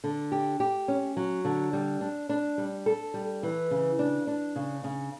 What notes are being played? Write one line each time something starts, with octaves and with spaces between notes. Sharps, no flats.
D3
G4
G4
C#4
F#3
D3
G3
D4
D4
G3
A4
G3
E3
C#3
D4
D4
C#3
C#3